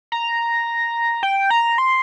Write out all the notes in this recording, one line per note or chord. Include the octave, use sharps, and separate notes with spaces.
A#5
G5
A#5
C6